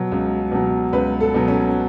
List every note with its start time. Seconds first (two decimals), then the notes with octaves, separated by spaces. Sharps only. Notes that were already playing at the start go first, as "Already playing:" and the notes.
Already playing: B2 F#3
0.12 C#2
0.52 B2 F#3
0.93 C#2 B4
1.21 A4
1.34 B2 F#3
1.48 C#4